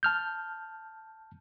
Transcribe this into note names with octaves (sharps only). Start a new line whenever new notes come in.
A5 F6 G6